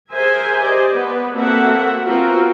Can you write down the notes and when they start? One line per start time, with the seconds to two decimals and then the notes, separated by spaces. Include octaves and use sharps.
0.12 G#4 A#4 C5 E5 G#5
0.62 G4 C5 D5 D#5
0.91 B3 B4
1.35 A#3 C4 F#4 A4 E5 F#5
2.04 B3 C4 F4 F#4 A#4